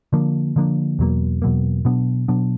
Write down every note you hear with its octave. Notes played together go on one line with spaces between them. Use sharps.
D3 F3 A#3 D4
D3 F3 A#3 D4
E2 B2 F#3 A#3
E2 B2 F#3 A#3
B2 F#3 B3 D4
B2 F#3 B3 D4